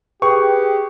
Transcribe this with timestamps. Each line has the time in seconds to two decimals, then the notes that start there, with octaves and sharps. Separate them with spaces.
0.22 G4 G#4 B4 G5 C#6